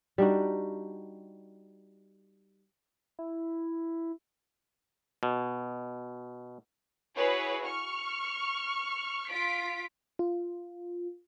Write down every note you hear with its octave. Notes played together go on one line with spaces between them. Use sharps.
G3 D4 D#4 F#4
E4
B2
E4 F#4 G#4 B4 C#5
C#6 F6
F4 B6 D7
F4